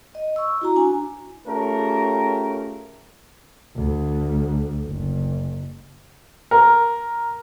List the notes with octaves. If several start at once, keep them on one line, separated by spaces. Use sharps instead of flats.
D#5
C#6 E6
E4 F#4 A#5
D4 G#5
A3 C#4 F4 G4 G#4 A#4
D2
F#1
A#4